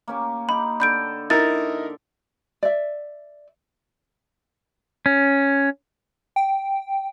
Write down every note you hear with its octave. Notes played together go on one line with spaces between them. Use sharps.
A#3 C#4 G4
D#4 G4 B5
D3 A4 B5 G6 D7
D#4 E4 A#4 A6
D5 E5
C#4
G5